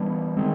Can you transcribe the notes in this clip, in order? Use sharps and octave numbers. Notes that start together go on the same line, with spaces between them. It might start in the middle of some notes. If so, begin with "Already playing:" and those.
Already playing: E3 G3 B3 D4
D#3 G#3 C4